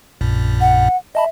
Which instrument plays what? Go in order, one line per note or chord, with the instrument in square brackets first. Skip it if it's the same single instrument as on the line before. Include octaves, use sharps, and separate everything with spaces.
[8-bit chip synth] A#1 F#2 A#2
[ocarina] F#5
[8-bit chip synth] D#5 A5 B5 [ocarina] E5